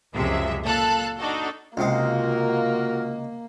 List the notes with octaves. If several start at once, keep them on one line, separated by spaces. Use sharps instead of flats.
C#2 F#2 C3 F3 G#3 E5
A#2 A4 F5 A5 F#6
D4 D#4 F#4 A4
C#2 C3 G#3 A#3 F4 F#4 A#4